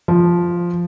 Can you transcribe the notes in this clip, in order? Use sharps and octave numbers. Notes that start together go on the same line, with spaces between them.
F3